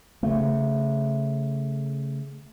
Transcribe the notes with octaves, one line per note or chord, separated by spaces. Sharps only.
C#3 A3